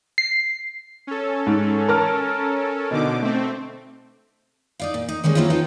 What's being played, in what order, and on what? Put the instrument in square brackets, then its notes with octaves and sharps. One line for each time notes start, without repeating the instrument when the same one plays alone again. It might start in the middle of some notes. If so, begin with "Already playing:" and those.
[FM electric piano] C7
[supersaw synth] C#4 A4
[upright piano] G#2
A#4 A5 F6
[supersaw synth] B2 D3 D6 [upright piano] D#4
[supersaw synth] A3 C4
[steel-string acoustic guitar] D#4 D5 F5
A#2
D#4
D#3 G3 G#3 C#4
F#3 A#3 C4 C#4 E4 F4
D#4 F4 B4 C#5 G5 A5